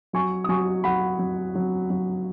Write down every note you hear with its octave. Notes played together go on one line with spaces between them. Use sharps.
F#3 G#5 C#6
D#6
F#3 G#5 C#6
F#3 F#5 B5
F#3
F#3
F#3